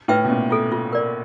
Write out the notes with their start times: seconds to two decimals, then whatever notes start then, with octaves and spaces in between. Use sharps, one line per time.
0.08 A2 B4 E5 G5
0.25 B2
0.29 A#2 C#4
0.50 F4 A4
0.72 F4
0.93 A#4 D5